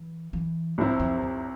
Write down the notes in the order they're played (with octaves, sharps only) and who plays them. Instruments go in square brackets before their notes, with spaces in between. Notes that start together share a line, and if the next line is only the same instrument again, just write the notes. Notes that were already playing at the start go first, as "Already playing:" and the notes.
Already playing: [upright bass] E3
E3
[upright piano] C2 C3 F3 C4 E4
[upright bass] F2
F2